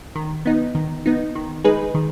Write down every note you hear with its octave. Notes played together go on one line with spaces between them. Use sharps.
D#3
B3 D#4
D#3
B3 D#4
D#3
G#3 D#4 G#4 B4
D#3